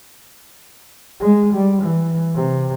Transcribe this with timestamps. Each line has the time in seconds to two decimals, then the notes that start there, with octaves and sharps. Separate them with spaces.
1.20 G#3
1.54 G3
1.83 E3
2.34 C3